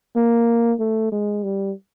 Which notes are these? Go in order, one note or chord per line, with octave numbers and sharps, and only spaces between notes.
A#3
A3
G#3
G3